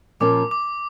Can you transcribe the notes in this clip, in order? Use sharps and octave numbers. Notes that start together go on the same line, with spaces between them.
A#2 F3 A#3 C#4 D6
D6